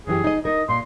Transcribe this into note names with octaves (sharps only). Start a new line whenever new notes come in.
F#2 E3 G4 G#4
D#4 D#5
D#4 A#4 D#5
A#2 C6